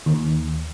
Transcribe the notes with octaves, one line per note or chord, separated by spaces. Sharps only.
D#2